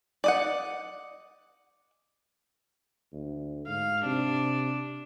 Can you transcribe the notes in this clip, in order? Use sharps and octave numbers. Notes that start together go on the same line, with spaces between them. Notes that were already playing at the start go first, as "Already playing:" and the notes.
D5 D#5 F#5
D2
G#2 F5
C3 D4